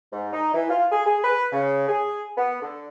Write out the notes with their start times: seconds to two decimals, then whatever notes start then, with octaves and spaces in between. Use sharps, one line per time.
0.13 G#2
0.33 D#4
0.54 E3
0.70 F4
0.92 G#4
1.06 G#4
1.24 B4
1.52 C#3
1.89 G#4
2.37 B3
2.62 D3